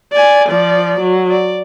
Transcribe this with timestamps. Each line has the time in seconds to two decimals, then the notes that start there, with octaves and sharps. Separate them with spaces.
0.12 D5 G#5
0.49 F3 D5
1.00 F#3
1.30 D5